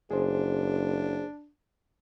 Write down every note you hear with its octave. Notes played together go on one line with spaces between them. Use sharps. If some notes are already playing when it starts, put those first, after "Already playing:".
F#1 D4 G#4 C5